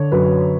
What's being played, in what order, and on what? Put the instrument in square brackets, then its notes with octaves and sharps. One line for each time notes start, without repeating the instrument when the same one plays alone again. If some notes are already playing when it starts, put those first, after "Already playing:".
Already playing: [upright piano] D3 C#5
F#2 B4